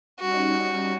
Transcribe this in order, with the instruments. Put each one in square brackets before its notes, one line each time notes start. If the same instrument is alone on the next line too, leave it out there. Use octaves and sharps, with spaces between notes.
[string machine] G3 C#4 D#4 [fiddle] F#4